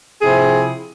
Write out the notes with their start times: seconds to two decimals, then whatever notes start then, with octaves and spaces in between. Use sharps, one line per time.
0.22 C3 F3 C4 E4 G#4